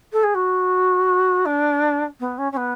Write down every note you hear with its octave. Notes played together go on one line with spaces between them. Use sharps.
A4
G#4
F#4
D4
B3
C#4
C#4
B3